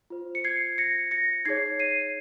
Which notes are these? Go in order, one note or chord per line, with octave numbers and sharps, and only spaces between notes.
F4 C5
C#7
G#6 C7
A#6 C#7
A#6 C#7
D#4 G#4 C#5 G#6 C7
C7 D#7